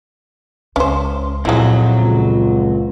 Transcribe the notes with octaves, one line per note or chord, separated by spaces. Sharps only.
C#2 C#4 C5
F2 A#2 F#3 G#3 E4
C#2